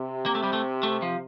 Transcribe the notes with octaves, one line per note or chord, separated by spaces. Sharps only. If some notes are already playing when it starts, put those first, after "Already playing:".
Already playing: C3
A#3
A3
G3
A3
A3
F3